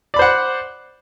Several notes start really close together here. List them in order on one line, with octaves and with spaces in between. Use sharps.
D5 B5 C5 F#5